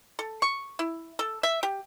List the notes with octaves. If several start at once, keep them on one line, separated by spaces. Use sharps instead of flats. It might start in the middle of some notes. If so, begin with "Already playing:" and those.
A4
C#6
E4
A4
E5
G4